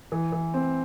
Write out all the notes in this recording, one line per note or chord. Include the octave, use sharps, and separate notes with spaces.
E3
E3
C4